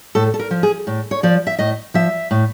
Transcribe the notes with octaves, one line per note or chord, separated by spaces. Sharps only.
A2 A4
A4
A#4
F3
G#4
A2
C#5
F3 D5
E5
A2 D#5
F3 E5
A2